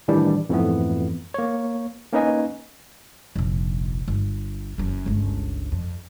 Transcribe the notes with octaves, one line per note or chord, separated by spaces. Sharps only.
A2 D#3 E3 G3 D4
F2 G#2 E3 F3 A3 B3
A#3 C#5
A#3 C#4 D#4 B4 D#5 G#5
F1 A#1
G1
F#1 F#2
G1 C#2
F2